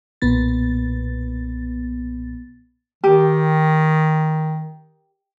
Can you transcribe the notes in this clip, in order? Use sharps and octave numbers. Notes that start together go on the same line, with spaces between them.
B1 A#2 B3 A6
D#3 G4